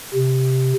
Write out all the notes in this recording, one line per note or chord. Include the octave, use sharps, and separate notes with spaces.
C3